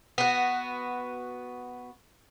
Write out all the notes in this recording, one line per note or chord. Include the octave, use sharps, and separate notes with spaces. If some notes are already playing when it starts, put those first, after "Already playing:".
B3 F#4